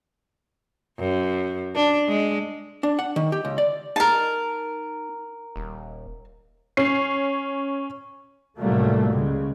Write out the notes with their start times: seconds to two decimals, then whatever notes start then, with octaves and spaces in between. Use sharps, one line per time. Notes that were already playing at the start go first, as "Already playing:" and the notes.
0.99 F#2
1.75 D4
2.09 G#3
2.83 D4
2.99 F#5
3.16 D#3
3.32 G4
3.45 C#2
3.58 D5
3.96 D#4 A#4 A5
5.56 D#1
6.77 C#4 C7
8.59 F1 A2 F#3 G3 A3 A#3
9.12 C#2 C#3 G#3